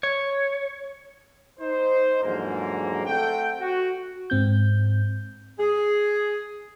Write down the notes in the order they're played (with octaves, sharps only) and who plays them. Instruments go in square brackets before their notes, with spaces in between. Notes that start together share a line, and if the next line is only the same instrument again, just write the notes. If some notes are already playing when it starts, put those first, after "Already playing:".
[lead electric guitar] C#5
[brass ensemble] D#4 C5
E2 G#2 D3 F3 F#3 A#3
A3 C4 A4 F#5 G5
F#4
[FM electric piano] G#2 C4 G6
[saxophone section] G#4